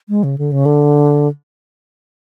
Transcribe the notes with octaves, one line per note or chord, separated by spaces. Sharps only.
G#3
C#3
D3
C#3
D3